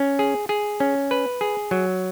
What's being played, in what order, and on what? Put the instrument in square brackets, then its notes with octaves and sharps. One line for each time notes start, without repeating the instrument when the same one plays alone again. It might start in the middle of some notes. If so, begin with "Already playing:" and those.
Already playing: [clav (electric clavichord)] C#4
G#4
G#4
C#4
B4
G#4
F#3